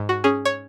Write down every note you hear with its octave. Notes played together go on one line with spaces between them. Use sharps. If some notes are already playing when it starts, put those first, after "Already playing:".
Already playing: G#2
F#4
C#4 G#4
C#5